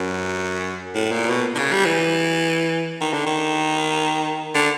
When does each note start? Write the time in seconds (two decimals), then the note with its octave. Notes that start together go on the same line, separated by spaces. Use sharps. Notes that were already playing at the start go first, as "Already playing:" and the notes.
Already playing: F#2
0.95 A2
1.11 A#2
1.30 B2
1.55 D3
1.59 C#3
1.72 G3
1.85 E3
3.01 D#3
3.13 D3
3.26 D#3
4.55 D3